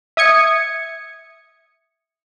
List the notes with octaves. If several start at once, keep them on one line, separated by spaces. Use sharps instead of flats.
E5 D#6 G#6 C#7